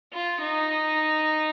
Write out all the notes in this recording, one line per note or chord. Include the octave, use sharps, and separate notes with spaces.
F4
D#4